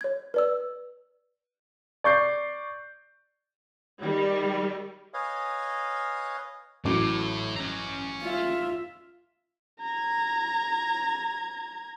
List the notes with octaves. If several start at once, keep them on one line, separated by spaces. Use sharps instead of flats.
C#5 G#6
B4 D5 E6
D5 C#6 G6 C7
D#3 G3
B4 C#5 D#5 F5 G#5
A1 A2 F#3 D6
C#4 A#5
F4 E5
A#5 G#6